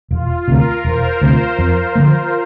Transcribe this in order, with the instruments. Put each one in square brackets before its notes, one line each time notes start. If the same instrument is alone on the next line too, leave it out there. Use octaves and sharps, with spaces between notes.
[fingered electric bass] E1 [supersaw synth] F4
[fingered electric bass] D2 C3 [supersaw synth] A#4
[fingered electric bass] E1 [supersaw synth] C5
[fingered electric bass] D2 C3
F2
D3 F3 A#3